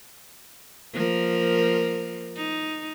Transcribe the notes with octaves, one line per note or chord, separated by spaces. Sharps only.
F3 A#3 A#4
D#4